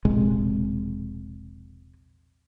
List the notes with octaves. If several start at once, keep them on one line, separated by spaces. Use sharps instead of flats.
E1 A#1 C3 G#3